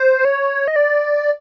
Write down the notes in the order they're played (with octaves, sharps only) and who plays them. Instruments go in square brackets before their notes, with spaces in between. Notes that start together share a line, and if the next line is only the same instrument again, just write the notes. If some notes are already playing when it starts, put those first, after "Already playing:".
Already playing: [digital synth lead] C5
C#5
D#5
D5